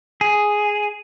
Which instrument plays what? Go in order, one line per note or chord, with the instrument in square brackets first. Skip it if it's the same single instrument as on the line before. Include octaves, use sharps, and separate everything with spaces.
[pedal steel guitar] G#4